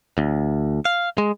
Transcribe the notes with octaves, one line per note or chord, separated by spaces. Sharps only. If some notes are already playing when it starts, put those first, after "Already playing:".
D2
F5
G#3